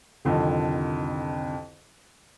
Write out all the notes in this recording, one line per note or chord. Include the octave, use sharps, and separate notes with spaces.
C2 F2 D3 D#3